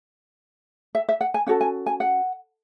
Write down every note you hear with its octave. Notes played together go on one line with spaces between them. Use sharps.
E5
E5
F#5
G#5
C#4 F#4 A4 F#5
G#5
G#5
F#5